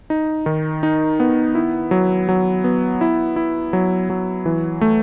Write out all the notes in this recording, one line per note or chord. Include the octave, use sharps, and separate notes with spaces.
D#4
D#3
D#4
B3
E4
F#3
F#3
B3
E4
E4
F#3
F#3
E3
A3